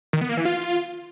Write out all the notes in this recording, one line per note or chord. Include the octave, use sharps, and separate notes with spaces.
D#3
B3
A#3
E3
F4